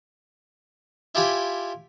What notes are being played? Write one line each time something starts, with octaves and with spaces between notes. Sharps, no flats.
E4 F4 G4 G#5 B5 D6